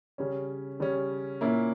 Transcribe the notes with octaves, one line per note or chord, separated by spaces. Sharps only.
C#3 G3 C#4
C#3 G3 C#4
A#2 A#3 C#4 E4